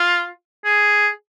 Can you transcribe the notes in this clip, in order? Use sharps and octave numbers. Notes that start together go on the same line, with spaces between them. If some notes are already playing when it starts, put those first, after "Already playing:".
Already playing: F4
G#4